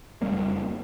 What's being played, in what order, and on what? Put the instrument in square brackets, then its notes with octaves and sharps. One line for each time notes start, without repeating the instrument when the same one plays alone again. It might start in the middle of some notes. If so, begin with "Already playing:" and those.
[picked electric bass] F#1 F2 G3 A#3